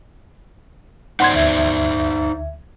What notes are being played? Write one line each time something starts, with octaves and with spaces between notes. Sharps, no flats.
D#4 C5 D5 F#5 C6 G#6
D2 E5 G#6